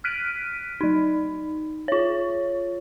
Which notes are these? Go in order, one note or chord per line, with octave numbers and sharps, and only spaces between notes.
F6 F#6 B6 D7 D#7
F#3 D#4
F4 C#5